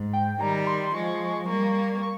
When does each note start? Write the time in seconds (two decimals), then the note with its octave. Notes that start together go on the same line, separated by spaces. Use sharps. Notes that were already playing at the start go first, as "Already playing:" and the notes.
Already playing: G#2
0.13 G5
0.40 D#3 G3 A#5
0.67 C6
0.94 F3 G#3 C#6
1.48 G3 A#3
2.03 C#6